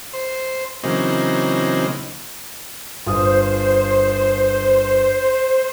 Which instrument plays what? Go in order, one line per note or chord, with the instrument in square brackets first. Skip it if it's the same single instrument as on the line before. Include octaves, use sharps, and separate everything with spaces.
[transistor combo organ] C5
C#3 E3 F#3 A#3 C4 D#4
[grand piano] G1 F4 D#6 [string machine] C5